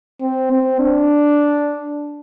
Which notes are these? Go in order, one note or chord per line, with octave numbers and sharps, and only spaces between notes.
C4
C4
D4